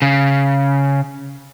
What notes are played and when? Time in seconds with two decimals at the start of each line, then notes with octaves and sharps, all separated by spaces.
0.02 C#3